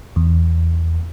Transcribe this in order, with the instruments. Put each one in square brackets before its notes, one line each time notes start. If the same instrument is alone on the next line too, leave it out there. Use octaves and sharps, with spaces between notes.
[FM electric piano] E2